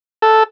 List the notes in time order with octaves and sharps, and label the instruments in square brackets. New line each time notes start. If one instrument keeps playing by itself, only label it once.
[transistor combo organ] A4